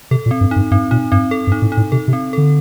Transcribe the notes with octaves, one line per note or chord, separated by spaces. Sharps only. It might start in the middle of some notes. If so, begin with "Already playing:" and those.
C3 A4
A#2
C4
G2
G2 D#4
G2 C4
A#2 D#4
G2 C4
A4
G2
D#4
A2
D#4
A2
C3 A4
C3
C4
D3 A4